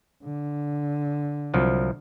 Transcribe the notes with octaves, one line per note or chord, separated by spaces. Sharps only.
D3
C2 F3 F#3